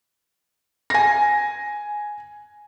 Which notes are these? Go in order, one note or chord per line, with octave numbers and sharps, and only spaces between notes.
G#5 A#6